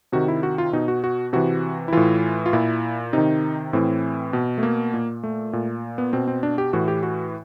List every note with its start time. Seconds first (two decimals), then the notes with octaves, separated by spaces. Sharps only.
0.12 C3 D#3 F#4
0.28 E4
0.43 F#4
0.58 F4
0.73 B2 D#4
0.88 F#4
1.04 F#4
1.33 C3 E3 F#4
1.88 E4
1.92 A2 E3 F4
2.46 F4
2.53 A#2 E4
3.13 C3 D#3 D#4
3.73 A2 E3 C4
4.33 B2
4.58 A3
4.63 A#3
4.94 A#2
5.23 A3
5.53 A#2
5.98 B3
6.13 B2 C4
6.28 C4
6.43 D4
6.58 G4
6.73 A2 E3 F#4
6.88 G4
7.03 F#4